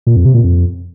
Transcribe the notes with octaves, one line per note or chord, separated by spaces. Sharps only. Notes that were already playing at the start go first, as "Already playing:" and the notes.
A#2
F2
C3
A#2
F2